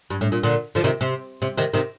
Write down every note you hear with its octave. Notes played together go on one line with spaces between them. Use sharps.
G2
A2
A#2
A#2 D3
D3 F3
C3 D#3
C3
C3
C3 D#3
C3 D#3